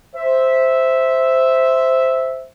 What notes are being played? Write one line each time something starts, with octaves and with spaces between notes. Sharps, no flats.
C5 E5